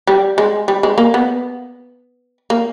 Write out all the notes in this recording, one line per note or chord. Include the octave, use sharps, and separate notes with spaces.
G3
G#3
G3
G#3
A#3
B3
A#3